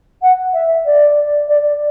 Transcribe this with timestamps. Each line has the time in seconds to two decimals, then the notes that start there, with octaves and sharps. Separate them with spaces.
0.22 F#5
0.54 E5
0.85 D5
1.48 D5